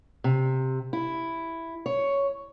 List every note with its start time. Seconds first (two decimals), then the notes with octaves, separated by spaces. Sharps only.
0.24 C3
0.93 E4
1.86 C#5